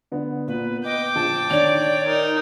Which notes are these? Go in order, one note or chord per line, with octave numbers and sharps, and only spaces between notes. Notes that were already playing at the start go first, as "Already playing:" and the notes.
D3 B3
A#2 B3 B4
D#5 G5 D6
A#1 A5
D#3 D4 C#5 D5 F7
D#4 A#4